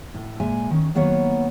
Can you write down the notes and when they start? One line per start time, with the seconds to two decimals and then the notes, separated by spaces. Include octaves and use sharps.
0.14 A2
0.40 A#2 G#3 E5 G#5
0.71 D#3 C#4
0.95 D#3 F#3 A#3 B3 B4 C#5